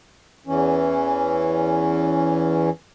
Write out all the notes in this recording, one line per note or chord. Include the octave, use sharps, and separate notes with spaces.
E2 E3 C#4